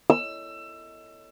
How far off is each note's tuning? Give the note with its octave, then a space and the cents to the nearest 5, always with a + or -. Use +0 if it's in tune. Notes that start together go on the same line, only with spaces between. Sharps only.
E6 +25